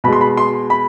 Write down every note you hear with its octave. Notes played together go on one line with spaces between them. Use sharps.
B2 G#3 B5 C6
B5
C6
B5